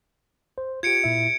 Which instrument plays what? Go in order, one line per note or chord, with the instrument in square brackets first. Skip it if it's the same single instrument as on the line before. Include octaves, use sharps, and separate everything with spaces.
[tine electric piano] C5
[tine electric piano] F4 G4 [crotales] G#6 C#7 D7
[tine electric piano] A#2 E4 E5